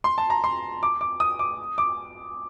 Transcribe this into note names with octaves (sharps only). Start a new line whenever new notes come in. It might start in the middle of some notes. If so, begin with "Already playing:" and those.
C6
A5
A#5
C6
D6
D6
D#6
D6
D6